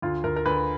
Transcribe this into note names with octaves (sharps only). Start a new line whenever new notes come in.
D2 F4
D2 A#4
A#4
D2 B4